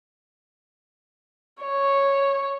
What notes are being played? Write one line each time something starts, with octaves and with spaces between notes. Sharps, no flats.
C#5